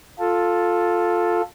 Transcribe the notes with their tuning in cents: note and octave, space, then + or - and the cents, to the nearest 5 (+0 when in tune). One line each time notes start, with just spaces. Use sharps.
F4 +10 A4 +0